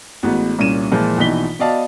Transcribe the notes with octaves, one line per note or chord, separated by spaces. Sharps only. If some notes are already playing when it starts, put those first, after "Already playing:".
A1 G#3 B3 F#4
C2 A#2 C#4 D#7 E7
A#2 E3 F3 G#3
A#1 B2 E3 D#4 B6 G7
B3 F#4 D5 D#5 F5 A5